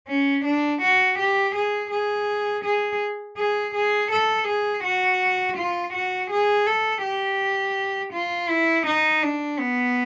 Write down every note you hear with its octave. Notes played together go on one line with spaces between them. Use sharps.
C#4
D4
F#4
G4
G#4
G#4
G#4
G#4
G#4
A4
G#4
F#4
F4
F#4
G#4
A4
G4
F4
E4
D#4
D4
B3